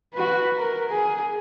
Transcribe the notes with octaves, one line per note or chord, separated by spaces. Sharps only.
F#4 B4
A#4
G#4